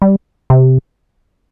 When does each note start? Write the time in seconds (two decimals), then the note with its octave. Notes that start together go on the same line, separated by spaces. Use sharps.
0.02 G3
0.50 C3